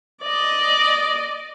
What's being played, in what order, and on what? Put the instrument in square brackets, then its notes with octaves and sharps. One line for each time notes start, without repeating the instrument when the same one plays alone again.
[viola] D5 D#5